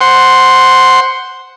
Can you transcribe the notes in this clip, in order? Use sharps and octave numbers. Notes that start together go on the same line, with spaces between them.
C5 F#5 C6